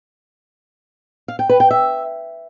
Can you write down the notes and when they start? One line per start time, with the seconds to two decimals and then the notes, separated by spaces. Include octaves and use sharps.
1.28 F5
1.39 G5
1.49 B4
1.60 G5
1.71 E5